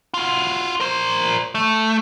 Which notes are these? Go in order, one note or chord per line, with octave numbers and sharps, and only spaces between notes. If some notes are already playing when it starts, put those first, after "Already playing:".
F4 F#4
A#4 C5
A3